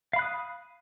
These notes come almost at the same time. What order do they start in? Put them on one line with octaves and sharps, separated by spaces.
F5 B5 F#6 D#6